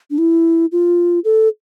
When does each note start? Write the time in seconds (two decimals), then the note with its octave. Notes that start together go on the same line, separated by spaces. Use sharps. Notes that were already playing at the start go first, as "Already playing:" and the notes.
0.11 D4
0.18 E4
0.72 F4
1.24 A4